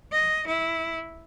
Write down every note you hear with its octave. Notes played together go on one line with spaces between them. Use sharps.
D#5
E4